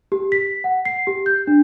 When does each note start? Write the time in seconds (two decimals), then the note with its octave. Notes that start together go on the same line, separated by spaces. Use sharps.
0.12 G4
0.32 B6
0.64 F#5
0.85 C7
1.07 G4
1.26 G6
1.47 D4